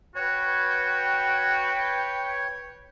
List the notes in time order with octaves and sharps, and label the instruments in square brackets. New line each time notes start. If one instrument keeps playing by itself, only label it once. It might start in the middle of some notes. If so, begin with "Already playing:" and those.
[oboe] F#4 [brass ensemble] B4 G5 [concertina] C#5